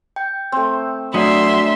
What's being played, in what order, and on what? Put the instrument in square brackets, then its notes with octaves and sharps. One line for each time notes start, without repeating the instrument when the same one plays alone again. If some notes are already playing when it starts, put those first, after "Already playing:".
[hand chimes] G5
[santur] A3 C4
[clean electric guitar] F#3 [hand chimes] A3 D4 D5 [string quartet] E5 C6 [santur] A#5 D#6